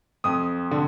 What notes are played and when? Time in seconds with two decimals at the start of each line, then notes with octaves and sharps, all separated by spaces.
0.24 F2 D#6
0.71 D3